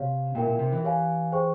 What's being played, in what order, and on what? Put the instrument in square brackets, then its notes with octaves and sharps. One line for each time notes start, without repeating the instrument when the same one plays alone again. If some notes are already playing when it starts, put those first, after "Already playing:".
Already playing: [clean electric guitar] C3 [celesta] G4 C#5 F5
[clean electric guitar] A#2 [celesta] E4 A#4 E5 G5
[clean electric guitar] A#2
C3
E3
[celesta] G4 C#5 F5 G#5
G#4 C5 G5 C#6